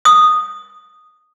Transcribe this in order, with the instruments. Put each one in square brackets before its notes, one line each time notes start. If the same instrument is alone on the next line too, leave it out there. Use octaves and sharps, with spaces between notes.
[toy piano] D#6